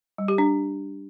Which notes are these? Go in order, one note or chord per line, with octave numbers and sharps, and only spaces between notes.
G3
G4
D4